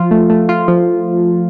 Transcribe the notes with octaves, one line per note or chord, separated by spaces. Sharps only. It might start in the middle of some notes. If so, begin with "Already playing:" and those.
Already playing: F3 F4
A3
A3
F4
F3